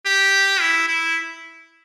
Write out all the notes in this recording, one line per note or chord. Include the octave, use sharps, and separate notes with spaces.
G4
E4
E4